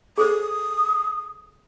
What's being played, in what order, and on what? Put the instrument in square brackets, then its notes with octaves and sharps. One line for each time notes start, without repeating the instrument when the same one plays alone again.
[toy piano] G#4 A4 C5 [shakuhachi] D#6